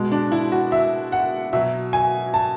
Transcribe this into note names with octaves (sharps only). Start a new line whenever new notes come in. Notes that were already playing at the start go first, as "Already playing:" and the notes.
Already playing: B2 G#3
D4
E4
F#4
E5
F#5
B2 F#3 E5
G#5
A5